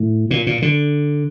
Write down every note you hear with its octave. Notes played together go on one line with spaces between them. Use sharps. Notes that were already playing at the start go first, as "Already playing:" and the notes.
Already playing: A2
A#2
A#2
D3